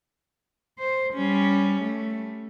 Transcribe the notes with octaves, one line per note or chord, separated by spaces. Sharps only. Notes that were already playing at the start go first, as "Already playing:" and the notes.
C5
G3 C#4
A3